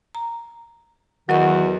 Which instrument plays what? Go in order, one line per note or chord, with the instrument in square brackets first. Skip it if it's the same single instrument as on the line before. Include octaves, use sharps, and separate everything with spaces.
[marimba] A#5
[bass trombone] E2 [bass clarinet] D#3 [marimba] F#3 D#5 C#6 [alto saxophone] F#4